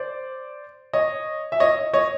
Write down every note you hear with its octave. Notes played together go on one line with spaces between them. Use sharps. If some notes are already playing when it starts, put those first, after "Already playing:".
Already playing: C5 D5
C#5 D#5
E5
C#5 D#5
C#5 D#5